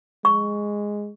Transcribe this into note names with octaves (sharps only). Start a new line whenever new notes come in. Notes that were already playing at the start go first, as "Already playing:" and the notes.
G#3 C#6